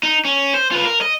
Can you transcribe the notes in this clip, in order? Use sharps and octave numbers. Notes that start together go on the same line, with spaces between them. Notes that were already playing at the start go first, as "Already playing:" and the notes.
D#4
C#4
C5
F4 B4
A#4
D#5